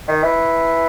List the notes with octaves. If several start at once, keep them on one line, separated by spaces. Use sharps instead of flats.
D#3
E3